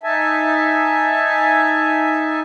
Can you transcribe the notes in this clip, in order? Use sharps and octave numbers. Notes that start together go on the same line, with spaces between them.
D#4 E5 G#5 A5